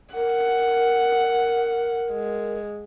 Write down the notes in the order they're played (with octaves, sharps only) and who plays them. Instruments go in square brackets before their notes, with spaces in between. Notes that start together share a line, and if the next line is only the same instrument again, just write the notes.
[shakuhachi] A#4 [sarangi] F#5
[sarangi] G#3